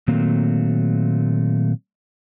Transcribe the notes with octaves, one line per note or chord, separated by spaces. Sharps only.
A#2 D#3 F#3 A3 A#3 C4